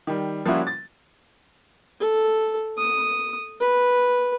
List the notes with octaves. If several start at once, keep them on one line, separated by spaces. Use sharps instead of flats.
D#3 G3
F3 G3 A#3 C#4 E4 F#4
A6
A4
D#6
B4